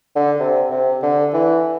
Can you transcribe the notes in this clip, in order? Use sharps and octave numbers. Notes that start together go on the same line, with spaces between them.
D3
C3
C3
D3
E3